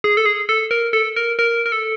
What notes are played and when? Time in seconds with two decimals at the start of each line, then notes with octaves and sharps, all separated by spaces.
0.04 G#4
0.17 A4
0.26 G#4
0.49 A4
0.71 A#4
0.93 A4
1.16 A#4
1.39 A#4
1.66 A#4
1.72 A4